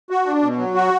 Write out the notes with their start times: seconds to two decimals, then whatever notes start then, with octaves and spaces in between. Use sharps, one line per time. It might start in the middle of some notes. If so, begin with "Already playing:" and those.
0.10 F#4
0.26 D4
0.42 B2
0.58 F#3
0.74 F#4